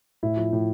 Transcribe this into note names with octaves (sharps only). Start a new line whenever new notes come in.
A2 E4
F3
A2